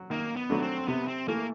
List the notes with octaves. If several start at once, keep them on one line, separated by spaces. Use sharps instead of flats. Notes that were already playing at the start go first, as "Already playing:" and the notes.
Already playing: F#3
D#3 A#3
B3
F#3 A3 D4 F#4
C4
C3 B3
C4
E3 A3 A#3